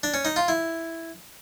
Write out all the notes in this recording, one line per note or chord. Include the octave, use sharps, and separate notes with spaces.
D4
C#4
D#4
F4
E4